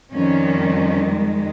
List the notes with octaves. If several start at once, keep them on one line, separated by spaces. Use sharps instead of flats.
F2 D#3 G3 C#4
G#3